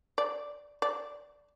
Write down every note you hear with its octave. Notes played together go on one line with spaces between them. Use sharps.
D5
D5